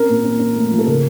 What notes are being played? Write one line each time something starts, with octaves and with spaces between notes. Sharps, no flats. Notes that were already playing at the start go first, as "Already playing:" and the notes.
Already playing: C4 C#4 A#4
A#2
C#4
C#4
A3
F3
A4
C#3 A#4